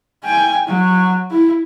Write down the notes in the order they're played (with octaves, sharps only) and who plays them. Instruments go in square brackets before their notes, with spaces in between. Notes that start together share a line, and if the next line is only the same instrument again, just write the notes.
[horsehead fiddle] G5 G#5
F#3
E4